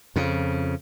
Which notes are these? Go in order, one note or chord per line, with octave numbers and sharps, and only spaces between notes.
F2 C#3